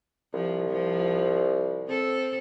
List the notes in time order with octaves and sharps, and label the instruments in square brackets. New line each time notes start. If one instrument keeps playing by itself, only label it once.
[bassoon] C2 [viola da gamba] F3
[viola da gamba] F3
C4 A4